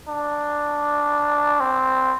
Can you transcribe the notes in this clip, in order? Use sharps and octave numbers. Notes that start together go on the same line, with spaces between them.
D4
C4